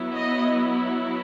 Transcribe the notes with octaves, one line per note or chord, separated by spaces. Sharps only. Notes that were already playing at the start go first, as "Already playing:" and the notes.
Already playing: F#3 B3 E4
D#5